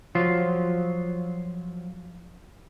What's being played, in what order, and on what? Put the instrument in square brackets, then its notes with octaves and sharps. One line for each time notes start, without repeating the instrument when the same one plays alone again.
[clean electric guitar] F3 F#3 F4